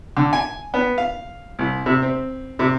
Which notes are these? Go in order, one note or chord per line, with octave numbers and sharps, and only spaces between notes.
D3
G#5
B3
F5
C2
C3
C4
C3